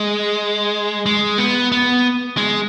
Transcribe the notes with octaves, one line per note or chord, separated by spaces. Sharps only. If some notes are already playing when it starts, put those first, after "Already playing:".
Already playing: G#3
G#3
B3
B3
G#3